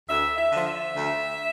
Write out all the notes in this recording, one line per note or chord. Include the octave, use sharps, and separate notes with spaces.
D2 E5
E5
D3 F3
E5
D2